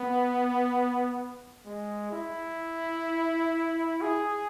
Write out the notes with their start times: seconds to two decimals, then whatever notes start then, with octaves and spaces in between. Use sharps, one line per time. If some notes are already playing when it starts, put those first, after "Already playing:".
Already playing: B3
1.65 G#3
2.12 E4
4.01 G#4